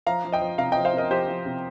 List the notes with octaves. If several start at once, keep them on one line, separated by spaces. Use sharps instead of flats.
F3 F5 A#5
F3
D#5 G5
F3
C3 F5 A#5
F3 D#5 G5
C5 F5
C3 A#4 D#5
F3 G4 C5
F3
C3